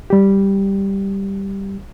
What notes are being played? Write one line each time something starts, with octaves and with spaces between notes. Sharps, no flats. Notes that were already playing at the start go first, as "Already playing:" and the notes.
G3 G4